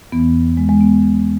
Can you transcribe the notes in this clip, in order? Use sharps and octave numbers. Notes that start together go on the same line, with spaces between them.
E2 E3 B3
G#3
G#3
B3